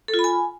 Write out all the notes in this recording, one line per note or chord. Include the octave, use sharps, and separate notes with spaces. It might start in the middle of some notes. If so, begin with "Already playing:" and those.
A4
F4
B5
G#5